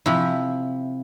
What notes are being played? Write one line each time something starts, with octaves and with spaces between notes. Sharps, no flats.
C3 F3 E4